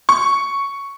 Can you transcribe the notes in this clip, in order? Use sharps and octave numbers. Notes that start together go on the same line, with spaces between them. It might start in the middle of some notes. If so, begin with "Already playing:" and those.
C#6